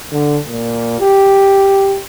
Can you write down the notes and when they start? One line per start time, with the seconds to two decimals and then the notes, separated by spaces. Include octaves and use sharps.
0.12 D3
0.48 A#2
1.00 G4